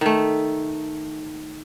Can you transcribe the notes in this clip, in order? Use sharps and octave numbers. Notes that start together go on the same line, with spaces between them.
D#3 A3